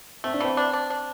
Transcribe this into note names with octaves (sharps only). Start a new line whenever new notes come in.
A3 C4
D4
E3 C4
D4
D4
D4